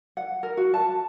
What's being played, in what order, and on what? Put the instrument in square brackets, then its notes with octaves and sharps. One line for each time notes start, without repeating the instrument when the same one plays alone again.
[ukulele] F#5
A#4
F#4
A5